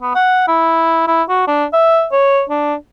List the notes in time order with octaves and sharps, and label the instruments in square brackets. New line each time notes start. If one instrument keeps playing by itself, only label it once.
[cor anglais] B3
F#5
E4
E4
F#4
D4
E5
C#5
D4